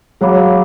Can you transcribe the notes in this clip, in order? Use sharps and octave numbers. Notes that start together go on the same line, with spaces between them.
F#3 G#4 C#5 F5 B5 D6